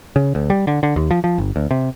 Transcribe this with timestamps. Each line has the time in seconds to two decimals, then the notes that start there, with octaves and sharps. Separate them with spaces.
0.16 C#3
0.35 D2
0.50 G3
0.67 D3
0.83 D3
0.96 D#2
1.11 F3
1.24 F3
1.38 G1
1.56 D2
1.71 C3